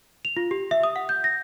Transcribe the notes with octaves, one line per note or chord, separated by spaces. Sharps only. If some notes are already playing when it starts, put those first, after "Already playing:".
F7
F4
G4
E5
D#6
F#5
G6
A#6